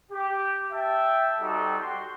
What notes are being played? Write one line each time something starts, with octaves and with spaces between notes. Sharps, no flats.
G4
E5 G5 A5
G3 C4 D#4 F#4 G4 A4
F#4 G4 C6